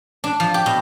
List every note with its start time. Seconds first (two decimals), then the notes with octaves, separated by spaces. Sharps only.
0.24 D4
0.40 F3
0.54 G4
0.66 B2